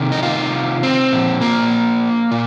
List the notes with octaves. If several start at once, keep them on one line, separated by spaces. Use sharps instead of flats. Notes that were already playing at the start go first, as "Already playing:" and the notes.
Already playing: C3 D#3
D#4
F4
C4
A#2 F3
A#3
A#2